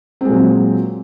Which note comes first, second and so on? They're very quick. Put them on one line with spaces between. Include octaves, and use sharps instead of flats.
C4 G#3 A#2 F#3